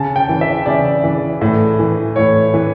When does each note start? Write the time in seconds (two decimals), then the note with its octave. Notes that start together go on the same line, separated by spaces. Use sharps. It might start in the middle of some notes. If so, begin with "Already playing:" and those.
Already playing: C#3 A5
0.16 G5
0.29 E3
0.41 E5
0.66 C#3 D5
1.04 E3
1.41 A2
1.79 E3
2.16 A2 C#5
2.54 E3